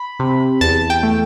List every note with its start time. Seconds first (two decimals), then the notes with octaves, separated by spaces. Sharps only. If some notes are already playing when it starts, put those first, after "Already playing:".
Already playing: B5
0.20 C3
0.61 E2 A5
0.90 G5
1.03 A3